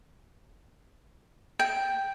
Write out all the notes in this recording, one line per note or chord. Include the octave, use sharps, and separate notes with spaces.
G5